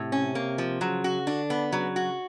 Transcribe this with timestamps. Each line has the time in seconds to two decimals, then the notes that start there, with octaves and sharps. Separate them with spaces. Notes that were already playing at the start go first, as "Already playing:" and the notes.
Already playing: A2 C3
0.12 C#4
0.35 A#3
0.58 F3
0.81 C#3 F#3
1.04 F#4
1.27 D3 D4
1.50 B3
1.73 C#3 F#3
1.96 F#4